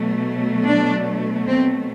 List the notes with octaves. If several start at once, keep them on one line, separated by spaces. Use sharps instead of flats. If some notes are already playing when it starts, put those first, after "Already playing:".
Already playing: B2 F#3 A3
D4
C4